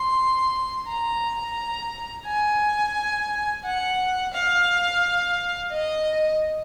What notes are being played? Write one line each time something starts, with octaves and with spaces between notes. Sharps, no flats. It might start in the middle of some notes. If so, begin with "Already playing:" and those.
Already playing: C6
A#5
G#5
F#5
F5
D#5